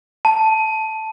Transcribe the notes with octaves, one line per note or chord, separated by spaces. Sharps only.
A5